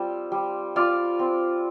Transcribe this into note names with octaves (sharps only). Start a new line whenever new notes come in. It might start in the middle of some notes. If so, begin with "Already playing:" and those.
Already playing: G3 C4 F4 C5
G3
F4 D5 F5
C4